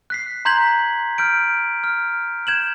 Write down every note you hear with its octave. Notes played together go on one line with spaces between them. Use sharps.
F#6 B6 C7
A#5 C6 G6 G#6 B6 F#7
F6 G6 D7
F6
G6 G#6 E7 F#7